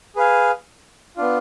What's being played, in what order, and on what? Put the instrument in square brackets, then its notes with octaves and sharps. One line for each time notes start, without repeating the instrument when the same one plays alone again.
[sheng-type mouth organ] G#4 B4 F5 G#5
B3 D4 F4